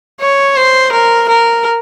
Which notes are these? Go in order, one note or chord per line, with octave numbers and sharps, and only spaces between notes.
C#5
C5
A#4
A#4